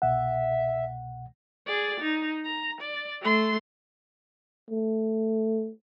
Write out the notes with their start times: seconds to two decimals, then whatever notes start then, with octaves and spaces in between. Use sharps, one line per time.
0.02 C2 B2 E5 F#5
1.67 G#4 D5
2.00 D#4
2.45 A#5
2.81 D5
3.21 A3 C6
4.70 A3